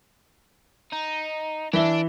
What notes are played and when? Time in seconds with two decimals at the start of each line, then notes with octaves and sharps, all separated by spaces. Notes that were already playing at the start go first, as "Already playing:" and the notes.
0.93 D#4
1.73 E3 D4 E5 G7